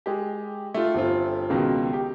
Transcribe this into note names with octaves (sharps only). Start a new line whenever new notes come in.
G#3 G4
A3 F4
G1 C4 F4
C#2 B2 D#3
G4